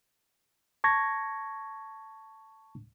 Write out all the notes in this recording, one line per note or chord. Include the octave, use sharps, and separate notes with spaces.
A5 C#6 G#6 A#6